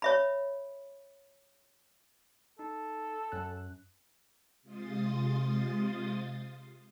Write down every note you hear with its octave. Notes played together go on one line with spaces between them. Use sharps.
C#5 E5 B5
D#4 A4
F#2 C#4 F#6
C3 G#3 F4 C6 D#6 A6